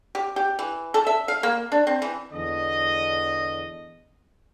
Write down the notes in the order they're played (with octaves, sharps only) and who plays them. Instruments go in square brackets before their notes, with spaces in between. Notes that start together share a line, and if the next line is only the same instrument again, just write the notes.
[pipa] G4
G4
E3
A4
E5
F5
A#3
D4
C4
E3
[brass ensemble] E2 D3 D#5